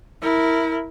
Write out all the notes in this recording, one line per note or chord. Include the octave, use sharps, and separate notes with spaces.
E4 A#4